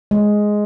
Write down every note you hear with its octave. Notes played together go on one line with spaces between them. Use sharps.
G#3